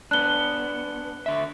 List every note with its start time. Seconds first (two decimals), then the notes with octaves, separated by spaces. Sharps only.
0.11 B3 D4 F#6 G7
1.26 D3 E5